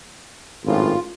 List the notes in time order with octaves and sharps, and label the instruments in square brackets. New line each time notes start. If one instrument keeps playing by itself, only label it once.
[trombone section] G#1 F#2 A2 [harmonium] F4